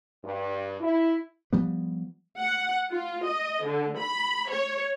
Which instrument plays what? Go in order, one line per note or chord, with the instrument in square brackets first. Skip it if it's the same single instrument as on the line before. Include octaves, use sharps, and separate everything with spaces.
[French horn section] G2
E4
[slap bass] F3 G3 B3
[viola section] F#5
F4
D#5
D3
B5
C#5